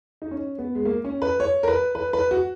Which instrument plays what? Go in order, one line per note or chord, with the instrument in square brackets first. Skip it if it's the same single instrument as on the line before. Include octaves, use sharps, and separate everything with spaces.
[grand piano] D#4
C#4
B3
G#3
A#3
C#4
B4
C#5
A#4
B4
B4
B4
F#4